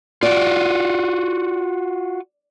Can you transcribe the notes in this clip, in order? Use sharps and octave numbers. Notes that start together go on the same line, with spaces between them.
F4 F#4 D5